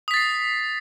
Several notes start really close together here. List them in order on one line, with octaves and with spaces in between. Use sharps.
D#6 B6 A6 C7